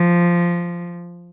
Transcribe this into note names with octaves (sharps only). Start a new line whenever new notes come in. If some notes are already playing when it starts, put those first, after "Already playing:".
Already playing: F3